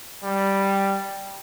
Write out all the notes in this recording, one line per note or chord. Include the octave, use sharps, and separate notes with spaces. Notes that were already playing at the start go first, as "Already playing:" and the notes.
G3